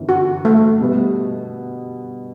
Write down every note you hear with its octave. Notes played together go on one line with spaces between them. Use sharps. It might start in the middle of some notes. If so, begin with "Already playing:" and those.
Already playing: G1 F#2 E3
F#4
A3
B2 G3 B3